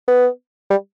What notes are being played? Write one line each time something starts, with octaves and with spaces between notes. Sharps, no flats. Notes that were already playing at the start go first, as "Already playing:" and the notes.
B3
G3